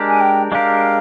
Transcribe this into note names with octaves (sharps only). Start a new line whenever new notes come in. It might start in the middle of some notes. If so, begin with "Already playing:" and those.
Already playing: G#3 D4 G4 A#4
G#5
G5
G#3 D4 G4 A#4 F5